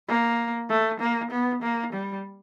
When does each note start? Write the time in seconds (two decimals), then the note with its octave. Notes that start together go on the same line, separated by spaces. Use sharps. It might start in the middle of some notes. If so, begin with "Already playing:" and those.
0.08 A#3
0.70 A3
1.00 A#3
1.31 B3
1.62 A#3
1.93 G3